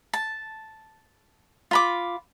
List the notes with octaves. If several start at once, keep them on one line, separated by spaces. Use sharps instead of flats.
A5
F4 B5 D6